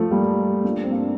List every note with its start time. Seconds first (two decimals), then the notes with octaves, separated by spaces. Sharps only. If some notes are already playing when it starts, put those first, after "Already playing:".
Already playing: F3 A3
0.11 G3 A#3
0.64 A#3 D4
0.84 C4
0.91 A#3 D4